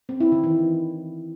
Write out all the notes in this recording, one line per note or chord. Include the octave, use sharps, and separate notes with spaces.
C4
E4
D#3
E3